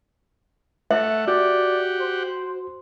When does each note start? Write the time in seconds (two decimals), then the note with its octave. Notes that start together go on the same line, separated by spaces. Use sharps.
0.91 A3 E5 F#5
1.28 F#4 G4 D5 F#5
2.01 C5